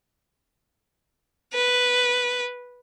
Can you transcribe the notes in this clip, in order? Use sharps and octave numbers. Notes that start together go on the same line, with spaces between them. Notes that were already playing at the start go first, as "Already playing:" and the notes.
B4